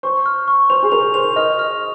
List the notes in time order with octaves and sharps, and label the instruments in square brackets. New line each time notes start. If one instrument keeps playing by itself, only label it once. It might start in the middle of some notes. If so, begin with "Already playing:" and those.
[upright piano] C5 [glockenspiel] C#6
[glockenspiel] F6
C#6
[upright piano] C5 [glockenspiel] F7
[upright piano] G#4
[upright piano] A#4 [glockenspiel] F7
[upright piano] C5 [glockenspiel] F7
[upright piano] D#5 [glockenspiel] F6
[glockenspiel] F6